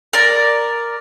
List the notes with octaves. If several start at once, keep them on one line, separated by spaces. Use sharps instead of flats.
A#4 D5